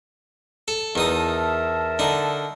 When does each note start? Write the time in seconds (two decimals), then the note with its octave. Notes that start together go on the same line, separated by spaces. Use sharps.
0.68 A4
0.95 E2 D#4 A#4 E5 A5 D#6
1.99 D3 D#4